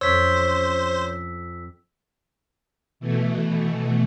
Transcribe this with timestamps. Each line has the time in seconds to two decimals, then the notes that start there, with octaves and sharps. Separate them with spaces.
0.01 F2 C#4 C5 C#5 E6 B6
3.00 B2 E3 A3